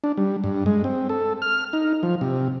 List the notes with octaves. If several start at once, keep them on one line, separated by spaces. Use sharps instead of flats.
D4
G3
G2
G#3
C4
A4
F6
D#4
F3
C3